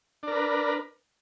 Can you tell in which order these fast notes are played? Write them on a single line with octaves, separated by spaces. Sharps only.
D4 A#4 B4